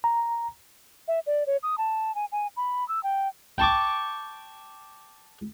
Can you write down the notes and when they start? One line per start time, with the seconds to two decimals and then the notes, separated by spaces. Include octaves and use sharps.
0.04 A#5
1.08 E5
1.27 D5
1.47 C#5
1.63 D#6
1.78 A5
2.15 G#5
2.32 G#5
2.57 B5
2.89 E6
3.03 G5
3.58 G5 A5 C#6 D6